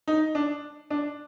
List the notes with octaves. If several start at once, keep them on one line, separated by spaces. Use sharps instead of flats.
D#4
D4
D4